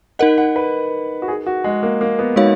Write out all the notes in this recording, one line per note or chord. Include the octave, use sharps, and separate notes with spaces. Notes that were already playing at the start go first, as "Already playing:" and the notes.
D#4 A#4 D#5 F#5
F#5
B4
F#4
G#4
F#4
G#3
A#3
A#3
B3
G#3 D#4 F#4 C#5 F5